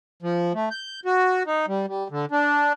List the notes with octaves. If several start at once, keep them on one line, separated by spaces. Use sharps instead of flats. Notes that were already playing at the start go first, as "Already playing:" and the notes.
F3
A3
G6
F#4
D#4
G3
G3
D3
D4